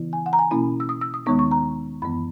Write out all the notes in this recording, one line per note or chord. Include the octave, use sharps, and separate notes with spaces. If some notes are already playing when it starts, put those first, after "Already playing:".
Already playing: C#3 E3 B3 E4
G#5
F#5
A#5
G#5
B2 A#3 C#4 E4 B5
E6
D#6
E6
D#6
D#2 D#3 G#3 B3 D#4 C#6
C#6
A#5
F#2 E3 B3 B5